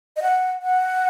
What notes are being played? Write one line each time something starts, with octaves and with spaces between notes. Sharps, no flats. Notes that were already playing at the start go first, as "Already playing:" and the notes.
D#5
F#5
F#5